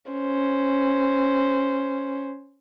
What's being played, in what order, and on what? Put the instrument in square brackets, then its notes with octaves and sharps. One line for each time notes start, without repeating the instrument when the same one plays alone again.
[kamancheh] C#4 C5